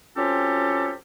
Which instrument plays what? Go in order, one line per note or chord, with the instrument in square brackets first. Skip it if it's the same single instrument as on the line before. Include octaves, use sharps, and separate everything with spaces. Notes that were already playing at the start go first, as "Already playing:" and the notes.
[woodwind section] F#3 C4 C#4 F4 G4 A4